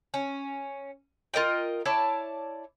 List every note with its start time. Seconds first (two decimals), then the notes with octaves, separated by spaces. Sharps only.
0.14 C#4
1.34 F4 A#4 D#5 G5
1.86 E4 C#5 D5 A5